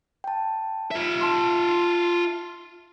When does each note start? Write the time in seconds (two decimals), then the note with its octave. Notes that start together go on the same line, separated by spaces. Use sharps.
0.24 G5 A5
0.91 F4 E5
1.21 A5 C6